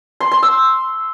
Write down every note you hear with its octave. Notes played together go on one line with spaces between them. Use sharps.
C6
C6
E6